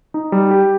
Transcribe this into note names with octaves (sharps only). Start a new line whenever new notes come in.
D#4
G3
G4